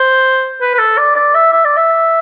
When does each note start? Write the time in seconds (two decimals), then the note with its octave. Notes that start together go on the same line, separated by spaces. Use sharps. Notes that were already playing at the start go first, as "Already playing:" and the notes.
Already playing: C5
0.61 B4
0.74 B4
0.79 A4
0.98 D5
1.16 D5
1.34 E5
1.53 E5
1.65 D5
1.77 E5